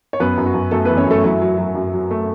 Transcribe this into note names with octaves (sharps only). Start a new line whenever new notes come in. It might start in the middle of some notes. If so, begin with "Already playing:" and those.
C#5
F#2 B3 B4
F#2
F#4
F#2
F#2 A3 A4
E3 B3 B4
C#4 C#5
F#2 A3 A4
F#3 E4
F#3
F#3
F#2
F#3
A3